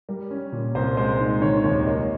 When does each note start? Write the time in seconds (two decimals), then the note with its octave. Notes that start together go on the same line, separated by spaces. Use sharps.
0.09 G3 A#4
0.31 C#4
0.52 A#2
0.75 C2 C5
0.97 G#3 C5
1.19 D#4
1.42 D#3 C#5
1.64 D#2 C#5
1.86 A#3 D#5